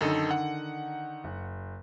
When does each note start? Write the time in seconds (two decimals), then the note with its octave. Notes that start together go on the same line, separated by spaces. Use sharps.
0.01 F#2 D3 D#3 D#4 A4 D#5
0.31 F#5
1.24 F#1